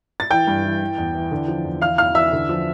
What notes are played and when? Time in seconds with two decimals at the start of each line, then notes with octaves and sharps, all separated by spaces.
0.20 A6
0.31 E3 G5 G6
0.47 G2
0.64 E3
0.81 E3
0.98 E2
1.15 E3
1.32 D3
1.48 F3
1.65 E2
1.81 E3 F5 F6
1.98 E2 F5 F6
2.15 E3 E5 E6
2.32 D3
2.49 F3